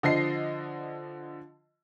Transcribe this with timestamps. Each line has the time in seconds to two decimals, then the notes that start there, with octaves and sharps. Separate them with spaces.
0.03 D3 F3 D#5 C7